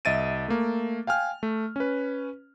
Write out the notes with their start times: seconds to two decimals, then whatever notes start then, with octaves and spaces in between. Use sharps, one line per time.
0.05 C2 D#5 E5 A6 D7 D#7
0.48 A3 A#3
1.07 F5 G5 G#5 F6
1.43 A3
1.76 C#4 B4